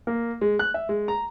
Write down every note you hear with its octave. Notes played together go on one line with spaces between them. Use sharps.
A#3
G#3
F#6
E5
G#3
A#5